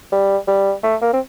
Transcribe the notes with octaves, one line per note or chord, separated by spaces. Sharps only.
G3
G3
A3
A#3
C4